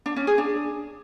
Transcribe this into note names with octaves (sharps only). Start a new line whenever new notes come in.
D4
C#4
G#4
D4